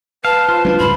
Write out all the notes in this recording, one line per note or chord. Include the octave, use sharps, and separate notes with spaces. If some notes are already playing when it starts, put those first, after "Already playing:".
B4 F5 A5
F4 C5
F#3 C4 D4
C#2 G#2 G3 B5